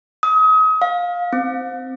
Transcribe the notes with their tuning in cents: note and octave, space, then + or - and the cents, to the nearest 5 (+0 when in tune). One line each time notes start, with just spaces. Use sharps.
D#6 +35
F5 +15
C4 -5